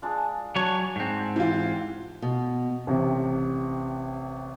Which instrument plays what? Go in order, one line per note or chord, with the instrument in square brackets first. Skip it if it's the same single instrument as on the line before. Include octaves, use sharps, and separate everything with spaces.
[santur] G#3 D4 F4
[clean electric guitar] F#3 C#5 [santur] D4
[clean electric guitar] G#2 C4 [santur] F#5
[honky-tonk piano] E3 F4
[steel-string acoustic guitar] B2
[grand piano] A1 C3